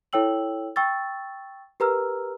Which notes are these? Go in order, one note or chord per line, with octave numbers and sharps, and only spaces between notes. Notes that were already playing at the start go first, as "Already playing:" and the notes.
E4 A4 C#5 G5 E6 F#7
G5 C#6 E6 A6
G4 A#4 B4 A#5 E6 F6